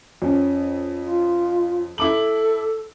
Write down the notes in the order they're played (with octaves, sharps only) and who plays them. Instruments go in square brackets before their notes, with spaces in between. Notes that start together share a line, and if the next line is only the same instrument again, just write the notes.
[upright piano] F2 C#4
[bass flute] F4
[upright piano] E4 D6 F#7 [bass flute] A4